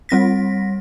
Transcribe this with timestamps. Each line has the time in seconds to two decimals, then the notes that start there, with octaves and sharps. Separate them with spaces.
0.09 G3 C4 A#6 B6